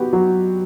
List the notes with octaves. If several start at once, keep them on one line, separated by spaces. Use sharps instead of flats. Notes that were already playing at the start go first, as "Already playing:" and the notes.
Already playing: B3 F#4 G4
F#3 F#4